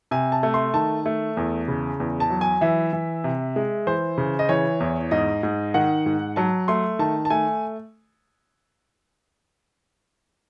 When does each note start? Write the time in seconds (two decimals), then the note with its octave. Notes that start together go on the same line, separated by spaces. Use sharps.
0.11 C3 G#5
0.32 A5
0.43 A3
0.54 C6
0.74 D#3 A5
1.06 A3
1.37 E2
1.68 C#3
2.00 E2
2.20 A5
2.30 F#3
2.41 G#5
2.61 E3 E5
2.93 E3
3.24 C3
3.56 G#3
3.87 E3 C5
4.18 C#3
4.39 D#5
4.49 E3 C#5
4.80 E2
5.11 G#2 D#5
5.43 G#2
5.74 D#3 F#5
6.06 G#2
6.36 F#3 A5
6.68 A3 C6
6.99 D#3 A5
7.25 A5
7.30 A3 G#5